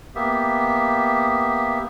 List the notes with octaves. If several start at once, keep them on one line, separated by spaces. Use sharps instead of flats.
A#3 B3 G4 E5